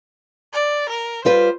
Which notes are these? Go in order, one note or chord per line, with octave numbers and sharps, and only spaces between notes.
D5
A#4
G3 F4 B4 C5